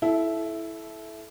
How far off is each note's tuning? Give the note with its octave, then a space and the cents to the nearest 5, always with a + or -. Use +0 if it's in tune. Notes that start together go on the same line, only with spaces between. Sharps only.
E4 +0 A4 -25